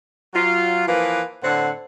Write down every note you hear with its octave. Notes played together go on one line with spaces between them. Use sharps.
F#3 F4
E3 F3 A#3 B4
A2 D3 C4 F#5